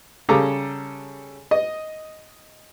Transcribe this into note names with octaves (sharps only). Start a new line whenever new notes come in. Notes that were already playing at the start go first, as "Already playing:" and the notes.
C#3 G3 A4 A#5 D6
D#5